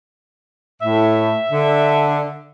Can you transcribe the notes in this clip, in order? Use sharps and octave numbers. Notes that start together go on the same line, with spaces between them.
A2 E5
D3